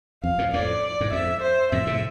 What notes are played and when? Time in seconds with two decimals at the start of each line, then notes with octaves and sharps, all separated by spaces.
0.23 F2 F5
0.38 F2 A2
0.53 F2 A2 D5
1.01 G#2
1.12 F2 E5
1.42 C5
1.72 F2 A2 E5
1.87 A2 C3